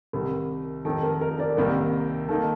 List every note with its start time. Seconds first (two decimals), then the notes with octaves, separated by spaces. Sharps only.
0.13 C2 C3 D#3 A#4
0.85 F1 F2 D#3 A4
1.03 A#4
1.21 A#4
1.39 A#4 D5
1.57 C2 C3 D#3 A#3 A#4
2.29 D#3 A#3 D#4 A4